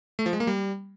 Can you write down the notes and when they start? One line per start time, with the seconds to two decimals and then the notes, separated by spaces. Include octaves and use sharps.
0.19 A3
0.26 F3
0.33 G#3
0.40 A#3
0.47 G3